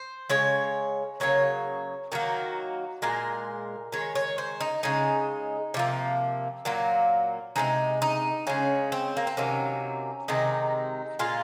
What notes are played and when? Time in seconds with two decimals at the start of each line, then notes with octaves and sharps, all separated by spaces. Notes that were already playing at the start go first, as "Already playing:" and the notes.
Already playing: C5
0.30 C#3 G#3 C#5
1.20 C#3 F#3 A#3 C#5
2.12 D#3 F#3 A#3 F#4
3.02 A#2 G#3 A#4
3.92 D#3 G#3 C#5
4.15 C#5
4.38 C5
4.61 D#4
4.83 C#3 G#3 D#4
5.74 C3 F3 A#3
6.65 A#2 F#3 A#3
7.56 C3 D#3 G#3 D#4
8.02 D#4
8.47 C#3 G#3 C#4
8.92 C4
9.17 A#3
9.27 C4
9.37 C3 D#3 F#3 A#3 C#4
10.28 C3 D#3 G#3 D#4
11.19 A#2 G#3 F4